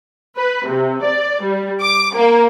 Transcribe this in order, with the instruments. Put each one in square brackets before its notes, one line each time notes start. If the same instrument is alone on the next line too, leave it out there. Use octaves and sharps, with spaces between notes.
[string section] B4
C3
D5
G3
D6
A#3